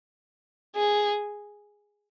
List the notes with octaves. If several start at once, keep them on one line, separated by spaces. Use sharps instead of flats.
G#4